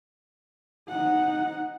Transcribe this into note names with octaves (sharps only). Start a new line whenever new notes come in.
D#4 F#5